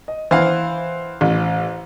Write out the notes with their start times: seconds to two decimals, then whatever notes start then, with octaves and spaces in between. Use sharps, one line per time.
0.08 D#5
0.31 E3 C5 F5 F#5
1.21 A1